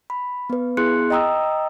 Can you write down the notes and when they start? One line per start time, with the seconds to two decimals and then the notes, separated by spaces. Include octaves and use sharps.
0.10 B5
0.50 B3 B4
0.77 B3 E4 G#4 C6 F#6 C#7
1.10 D#5 G5 A#5 D#6 E6